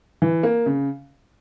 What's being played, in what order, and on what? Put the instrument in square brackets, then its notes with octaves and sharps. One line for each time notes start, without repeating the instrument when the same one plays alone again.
[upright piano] E3
A#3
C#3